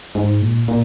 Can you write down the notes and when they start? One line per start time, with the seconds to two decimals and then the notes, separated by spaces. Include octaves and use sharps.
0.15 G#2
0.42 A#2
0.68 A#2